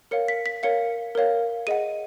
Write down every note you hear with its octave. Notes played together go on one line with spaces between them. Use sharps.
A#4 C#5 F5 C#7
B6
B6
A#4 C#5 F5 C#7
A#4 C#5 F5
G#4 D#5 F#5 D#7